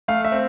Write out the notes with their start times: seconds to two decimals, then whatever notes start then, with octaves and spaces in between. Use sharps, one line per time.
0.08 A3 F5
0.25 E5
0.32 C4